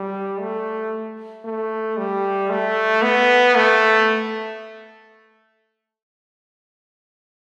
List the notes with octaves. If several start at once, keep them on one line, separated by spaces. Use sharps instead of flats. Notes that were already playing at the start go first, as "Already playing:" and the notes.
Already playing: G3
A3
A3
G3
A3
B3
A3